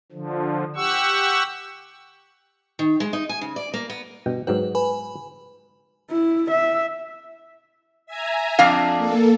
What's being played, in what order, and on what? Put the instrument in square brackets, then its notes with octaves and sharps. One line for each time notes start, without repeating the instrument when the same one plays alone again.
[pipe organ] D3 F3
G4 F#5 C#6 E6
[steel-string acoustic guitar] D#3
G#3
D#4
G#5
C#3
D5
A#3
B3
[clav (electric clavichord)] G2 B2 G5
[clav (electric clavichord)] G#2 F#3 G5 [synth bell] B4
[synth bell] B4 G#5 B5
[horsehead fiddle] E4
E5
[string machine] E5 G#5 A#5
[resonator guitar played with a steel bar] F2 D4 F5
[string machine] A#3 A4